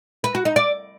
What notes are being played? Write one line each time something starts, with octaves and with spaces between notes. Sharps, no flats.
B4
F#4
D#4
D5